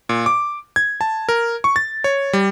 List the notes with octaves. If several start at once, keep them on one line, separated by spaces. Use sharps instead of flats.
A#2
D6
G#6
A5
A#4
C#6
A6
C#5
G3